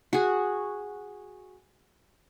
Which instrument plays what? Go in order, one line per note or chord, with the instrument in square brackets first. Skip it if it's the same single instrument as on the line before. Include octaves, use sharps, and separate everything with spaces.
[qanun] F#4 G#4